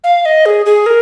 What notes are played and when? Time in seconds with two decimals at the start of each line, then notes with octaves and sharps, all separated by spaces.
0.04 F5
0.25 D#5
0.46 G#4
0.66 G#4
0.86 A#4